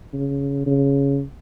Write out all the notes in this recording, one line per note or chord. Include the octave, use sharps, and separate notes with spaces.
C#3
C#3